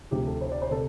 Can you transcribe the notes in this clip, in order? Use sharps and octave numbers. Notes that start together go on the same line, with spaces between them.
D2 C3 F3 G4
A4
C5
D5
C5
C3 A4